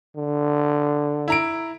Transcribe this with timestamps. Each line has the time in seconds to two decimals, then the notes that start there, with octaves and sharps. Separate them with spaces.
0.16 D3
1.28 E4 A#5 D7